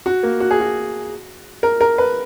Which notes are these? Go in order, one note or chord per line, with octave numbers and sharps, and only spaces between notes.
F#4
A#3
F#4
G#4
F#4
A#4
A#4
B4